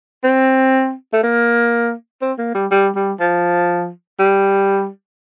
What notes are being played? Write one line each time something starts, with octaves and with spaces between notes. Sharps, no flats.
C4
A3
A#3
C4
A#3
G3
G3
G3
F3
G3